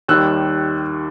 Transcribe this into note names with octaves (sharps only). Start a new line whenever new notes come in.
D#2 D#3 G3 E6 F#6